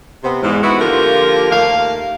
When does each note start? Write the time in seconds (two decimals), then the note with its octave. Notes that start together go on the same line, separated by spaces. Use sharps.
0.24 C3 B3 C4
0.43 E2 G#2
0.63 B3 E4 F#4
0.80 D3 F3 A#3 F4 G4 A#4
1.51 D#2 A3 A#3 F5